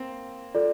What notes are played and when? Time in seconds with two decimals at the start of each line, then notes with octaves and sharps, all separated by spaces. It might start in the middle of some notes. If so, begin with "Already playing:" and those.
Already playing: A#3 C4
0.54 F4 A4 D5